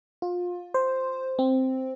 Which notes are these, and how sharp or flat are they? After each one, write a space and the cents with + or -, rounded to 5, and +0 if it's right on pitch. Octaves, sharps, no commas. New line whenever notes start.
F4 +25
C5 +0
C4 +0